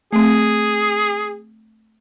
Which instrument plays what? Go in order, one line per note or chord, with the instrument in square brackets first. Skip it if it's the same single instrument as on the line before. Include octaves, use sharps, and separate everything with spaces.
[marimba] A3 C4 [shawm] G#4